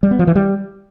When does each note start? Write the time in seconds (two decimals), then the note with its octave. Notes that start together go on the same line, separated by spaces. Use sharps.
0.03 G3
0.11 B3
0.19 F3
0.27 E3
0.35 G3